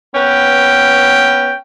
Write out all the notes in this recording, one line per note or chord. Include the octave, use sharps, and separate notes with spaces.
B3 C#4 B4 G5